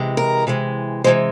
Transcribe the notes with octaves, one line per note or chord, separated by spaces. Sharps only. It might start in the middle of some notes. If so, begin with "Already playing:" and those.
Already playing: C3 E3 G#3
A#4
C3 E3 G#3
C3 E3 G#3 C5